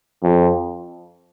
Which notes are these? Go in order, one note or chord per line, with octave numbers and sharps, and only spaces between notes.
F2